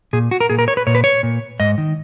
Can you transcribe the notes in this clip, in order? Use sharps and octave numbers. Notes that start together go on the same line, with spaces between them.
A#2 G#4
F#4
A#4
A#2 G#4
A#4
C#5
B4
A#2 C#5
B4
C#5
A#2
G#2 D#5
D#3